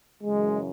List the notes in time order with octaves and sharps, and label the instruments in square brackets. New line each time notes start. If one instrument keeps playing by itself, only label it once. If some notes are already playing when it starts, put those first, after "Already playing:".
[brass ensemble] F#2 C#3 E3 G#3